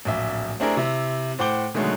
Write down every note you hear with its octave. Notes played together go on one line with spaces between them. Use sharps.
D1 A#1 E5
A3 C4 D4 E4 G#4 A#4
C3 E4
A2 C5 F#5 G5 D6 G7
B2 D3 D#3 F#3 G#3 A3